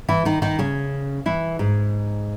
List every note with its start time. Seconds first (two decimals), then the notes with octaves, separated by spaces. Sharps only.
0.08 E3 E4
0.25 D#3 D#4
0.42 D#3 D#4
0.59 C#3 C#4
1.26 E3 E4
1.59 G#2 G#3